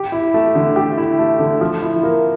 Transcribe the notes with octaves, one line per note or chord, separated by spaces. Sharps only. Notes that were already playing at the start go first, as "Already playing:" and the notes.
Already playing: G4
E4
A3
D3
G4
E4
A3
D3
F3
E4
A#3